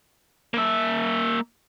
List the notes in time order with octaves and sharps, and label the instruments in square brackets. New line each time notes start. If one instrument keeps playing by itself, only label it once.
[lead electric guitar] A#3 E5